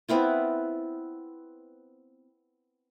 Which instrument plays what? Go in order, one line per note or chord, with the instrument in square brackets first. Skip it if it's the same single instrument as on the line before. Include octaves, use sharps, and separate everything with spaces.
[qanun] B3 C4 E4 F4